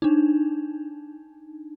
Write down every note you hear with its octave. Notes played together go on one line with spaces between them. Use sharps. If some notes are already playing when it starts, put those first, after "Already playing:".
D4 D#4